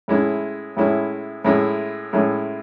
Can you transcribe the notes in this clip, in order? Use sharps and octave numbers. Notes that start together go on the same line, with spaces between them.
A2 G#3 C#4 E4
A2 G#3 C#4 E4
A2 G#3 C#4 E4
A2 G#3 C#4 E4